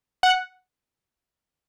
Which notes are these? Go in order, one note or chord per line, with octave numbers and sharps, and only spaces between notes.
F#5